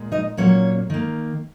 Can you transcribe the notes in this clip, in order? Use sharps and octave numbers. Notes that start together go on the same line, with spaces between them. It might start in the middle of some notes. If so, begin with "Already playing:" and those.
Already playing: A#2 G#3
D#4 D#5
A#2 F#3 A#3 C#4 C#5
D#3 A#3